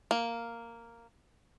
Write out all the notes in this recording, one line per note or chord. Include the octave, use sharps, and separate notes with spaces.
A#3